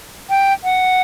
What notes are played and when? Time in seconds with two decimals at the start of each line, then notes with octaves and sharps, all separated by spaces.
0.30 G5
0.64 F#5